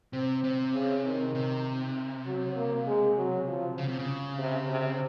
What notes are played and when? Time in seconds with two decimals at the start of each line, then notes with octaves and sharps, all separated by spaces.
0.13 C3 C4
0.43 C3 C4
0.74 C#3
1.05 D#3
1.35 C3
2.26 F#3
2.56 A#3
2.87 G#3
3.17 F#3
3.47 F3
3.78 C#3
3.88 C3
3.99 C#3
4.39 C3
4.70 C3